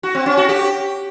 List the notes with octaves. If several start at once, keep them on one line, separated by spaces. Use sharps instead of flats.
F#4
C4
C#4
F#4
G4